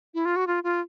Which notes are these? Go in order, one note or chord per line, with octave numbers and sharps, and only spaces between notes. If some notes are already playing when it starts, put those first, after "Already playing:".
E4
F4
F#4
F4
F4